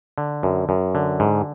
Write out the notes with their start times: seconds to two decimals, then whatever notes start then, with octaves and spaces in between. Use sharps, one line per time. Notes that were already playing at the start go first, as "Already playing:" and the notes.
0.18 D3
0.43 F#2
0.69 F#2
0.95 D3
1.20 G#2